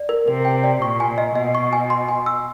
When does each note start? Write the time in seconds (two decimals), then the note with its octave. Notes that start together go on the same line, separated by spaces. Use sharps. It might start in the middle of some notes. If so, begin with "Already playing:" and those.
Already playing: D5
0.09 A#4
0.27 C3 A#4
0.45 G5
0.64 D5
0.82 A#2 C#6
1.00 G#5
1.18 D#5
1.35 B2 D#5
1.55 C#6
1.73 G#5
1.90 C6
2.09 G#5
2.26 E6